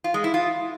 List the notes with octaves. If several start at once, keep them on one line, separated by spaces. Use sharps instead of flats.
F4
G#3
E4
F4